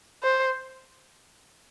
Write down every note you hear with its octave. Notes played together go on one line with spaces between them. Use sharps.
C5